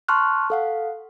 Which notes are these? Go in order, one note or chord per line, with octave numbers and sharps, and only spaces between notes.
A5 C6 C#6 F6 F#6
A4 F5 F#5